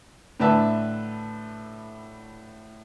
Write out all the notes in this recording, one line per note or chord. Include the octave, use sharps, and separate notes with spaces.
A2 D3 D4 B4 E5 A5